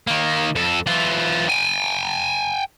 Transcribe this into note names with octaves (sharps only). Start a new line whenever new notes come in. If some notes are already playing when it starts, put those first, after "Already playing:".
D#3 A#3
F2 A4
E3 F4
G5 G#5